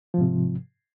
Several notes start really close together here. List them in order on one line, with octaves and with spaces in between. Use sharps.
F3 G#2 C3